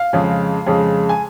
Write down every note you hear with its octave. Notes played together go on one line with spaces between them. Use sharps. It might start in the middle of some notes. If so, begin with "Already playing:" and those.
Already playing: F5
F2 C#3 G#3
F2 C#3 G#3
G#5